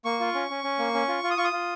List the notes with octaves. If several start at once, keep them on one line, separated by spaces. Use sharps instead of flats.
A#3 C#6
F4
C#4
C#4
C#4
A#3
C#4
F4
F4
D#6
F4 C#6
D#6
F4